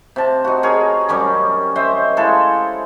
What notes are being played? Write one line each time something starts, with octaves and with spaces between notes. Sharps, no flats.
C3 A5
D#4 F#4
G#4 A#4 C#5
F#2 G3 C#4 D6
C5 D#5 E5
G#3 E4 A4 F5